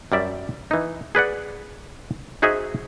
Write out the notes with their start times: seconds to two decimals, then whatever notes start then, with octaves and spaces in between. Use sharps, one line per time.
0.12 F#2 G3 D5 E5
0.71 E3 D#4
1.15 G#4 B4 D5 F#5
2.42 D#4 F#4 G#4 C5 D#5 E5